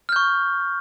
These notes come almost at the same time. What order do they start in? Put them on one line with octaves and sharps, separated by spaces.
F6 G6 C#6